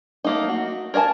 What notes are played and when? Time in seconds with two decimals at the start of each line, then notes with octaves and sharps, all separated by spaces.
0.24 A3 A#3 D#4
0.49 F#4
0.94 A#4 C#5 D5 G#5 A5